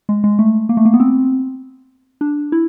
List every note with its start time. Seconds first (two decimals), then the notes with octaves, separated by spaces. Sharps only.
0.09 G#3
0.24 G#3
0.39 A3
0.69 A#3
0.77 A3
0.85 A#3
0.94 B3
1.00 C4
2.21 D4
2.52 E4